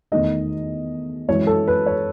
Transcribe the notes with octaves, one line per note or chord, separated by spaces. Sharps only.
E2 D#3 A3 D#4 D#5
F#2 E3 G#3 C#5
A4
B4
C#5